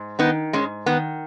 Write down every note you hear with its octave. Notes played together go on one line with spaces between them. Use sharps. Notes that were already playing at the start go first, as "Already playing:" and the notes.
Already playing: G#2
D#3 B3 D#4
G#2 G#3 C#4
D#3 B3